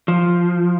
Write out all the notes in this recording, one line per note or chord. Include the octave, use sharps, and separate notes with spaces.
F3